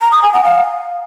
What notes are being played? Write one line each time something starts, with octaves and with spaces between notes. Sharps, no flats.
A#5
D#6
G#5
F#5
F5